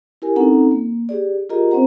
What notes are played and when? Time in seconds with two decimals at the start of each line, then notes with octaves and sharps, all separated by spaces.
0.22 E4 G4 A#4 G#5
0.36 C4 C#4 D#4 A4 F#5 A#5
0.71 A#3
1.09 G4 G#4 D5
1.50 F4 G4 G#4 A#4 D#5 A#5
1.71 C4 C#4 C5 F#5 A#5